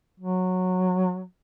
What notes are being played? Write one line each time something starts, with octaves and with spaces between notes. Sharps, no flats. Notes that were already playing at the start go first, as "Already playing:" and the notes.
F#3